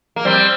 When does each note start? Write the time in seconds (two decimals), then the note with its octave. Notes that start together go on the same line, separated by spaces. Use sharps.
0.16 A#3
0.25 G3 C4